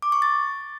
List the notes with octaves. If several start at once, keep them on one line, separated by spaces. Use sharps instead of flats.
D6
C#6
A6